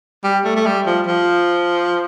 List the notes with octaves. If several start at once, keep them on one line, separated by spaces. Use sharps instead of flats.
G3
A3
A3
G3
F3
F3